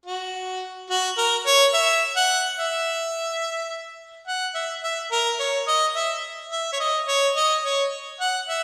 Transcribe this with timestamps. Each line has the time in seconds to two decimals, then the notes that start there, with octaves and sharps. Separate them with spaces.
0.05 F#4
0.90 F#4
1.18 A#4
1.46 C#5
1.74 E5
2.16 F#5
2.58 E5
4.27 F#5
4.55 E5
4.83 E5
5.12 A#4
5.39 C#5
5.67 D#5
5.96 E5
6.52 E5
6.73 C#5
6.80 D#5
7.08 C#5
7.36 D#5
7.64 C#5
8.20 F#5
8.48 E5